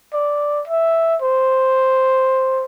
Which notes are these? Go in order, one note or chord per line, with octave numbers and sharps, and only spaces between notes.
D5
E5
C5